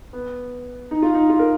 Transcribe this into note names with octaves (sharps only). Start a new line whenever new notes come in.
B3
D#4
F4
D#4
F4
A#4